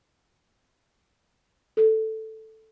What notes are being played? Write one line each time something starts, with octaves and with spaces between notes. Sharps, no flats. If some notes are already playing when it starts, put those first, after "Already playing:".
A4